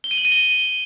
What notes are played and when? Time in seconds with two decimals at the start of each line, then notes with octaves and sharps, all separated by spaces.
0.04 G7
0.11 D#7
0.18 F#7
0.25 D#7
0.32 G7